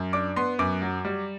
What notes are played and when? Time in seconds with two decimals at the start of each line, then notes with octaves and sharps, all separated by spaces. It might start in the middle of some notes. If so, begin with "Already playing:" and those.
Already playing: F#2
0.13 D4 D6
0.36 B3 C6
0.59 F#2 D6
0.82 F#3
1.05 G3